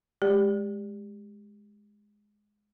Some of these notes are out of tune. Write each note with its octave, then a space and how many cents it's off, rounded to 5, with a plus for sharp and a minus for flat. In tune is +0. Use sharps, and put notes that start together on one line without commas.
G#3 +0 G4 +20 D5 +0